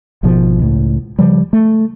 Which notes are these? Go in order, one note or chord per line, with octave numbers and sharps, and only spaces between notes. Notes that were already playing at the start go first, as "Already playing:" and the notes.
G#1 G#2 B2 F3
C#2 A2
C#3 F3 G3
A3